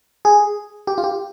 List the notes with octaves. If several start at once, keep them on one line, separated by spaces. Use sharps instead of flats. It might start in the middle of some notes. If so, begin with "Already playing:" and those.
G#4
G4
F4
G4